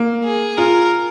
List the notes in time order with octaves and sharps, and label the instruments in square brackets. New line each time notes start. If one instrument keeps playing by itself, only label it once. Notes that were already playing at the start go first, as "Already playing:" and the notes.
Already playing: [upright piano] A#3
[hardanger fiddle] G#4
[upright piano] F4 [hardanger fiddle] A#4